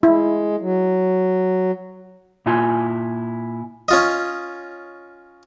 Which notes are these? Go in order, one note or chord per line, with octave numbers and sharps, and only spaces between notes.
G#3 E4
F#3
A#2 E4 F4 G#5
C#4 F4 D#5